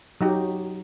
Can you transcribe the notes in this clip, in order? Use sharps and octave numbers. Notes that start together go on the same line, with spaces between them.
F#3 D#4 G4